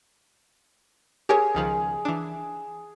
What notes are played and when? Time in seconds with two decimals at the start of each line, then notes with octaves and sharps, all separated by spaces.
1.29 G4 G#4 A#4 C#5
1.55 C#2 D#3 F3
2.05 E3 D4